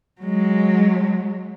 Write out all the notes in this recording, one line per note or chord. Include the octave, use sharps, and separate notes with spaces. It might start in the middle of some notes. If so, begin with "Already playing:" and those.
F#3 G#3